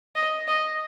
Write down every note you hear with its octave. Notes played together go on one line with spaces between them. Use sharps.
D#5
D#5